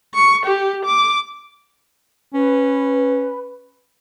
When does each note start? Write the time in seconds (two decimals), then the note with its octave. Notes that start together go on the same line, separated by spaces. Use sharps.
0.14 C#6
0.46 G4
0.85 D6
2.34 C#4 B4